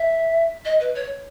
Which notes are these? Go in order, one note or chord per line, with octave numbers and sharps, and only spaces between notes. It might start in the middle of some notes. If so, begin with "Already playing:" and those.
Already playing: E5
D#5
B4
C#5